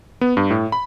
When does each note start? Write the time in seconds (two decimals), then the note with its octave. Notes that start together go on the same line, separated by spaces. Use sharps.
0.21 B3
0.37 G2
0.50 A2
0.72 B5